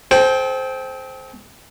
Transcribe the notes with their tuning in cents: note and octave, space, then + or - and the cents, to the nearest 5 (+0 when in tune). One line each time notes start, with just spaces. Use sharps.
A4 -45 C5 +0 G5 +0